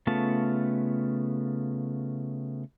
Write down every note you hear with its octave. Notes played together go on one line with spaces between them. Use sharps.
C#3 A3 B3 F4 A5